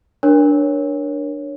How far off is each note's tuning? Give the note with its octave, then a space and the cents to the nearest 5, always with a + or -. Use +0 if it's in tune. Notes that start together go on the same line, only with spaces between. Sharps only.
D4 +0 A#4 +30 C#5 +0